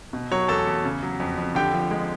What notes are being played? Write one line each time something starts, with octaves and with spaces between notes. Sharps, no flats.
B2
F#3 C#5 C#6
E2 A4 A5
E2
C#3
F#3
F2
F2
D3 G4 G5
F3
G#3